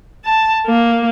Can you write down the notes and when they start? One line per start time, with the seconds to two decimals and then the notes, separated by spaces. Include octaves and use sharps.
0.25 A5
0.67 A#3